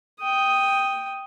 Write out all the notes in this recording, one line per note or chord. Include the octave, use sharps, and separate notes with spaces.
G5 D#6